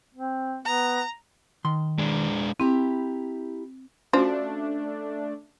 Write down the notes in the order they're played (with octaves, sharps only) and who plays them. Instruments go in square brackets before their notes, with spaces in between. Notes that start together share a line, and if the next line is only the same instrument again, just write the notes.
[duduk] C4
[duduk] B3 [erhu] A#5
[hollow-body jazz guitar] D#3 C6
[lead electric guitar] G#3 D4
[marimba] C4 [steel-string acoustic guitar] E4 G4 A#5
[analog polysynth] A3 D4 [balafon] C#4 F#4 [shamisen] F4 C5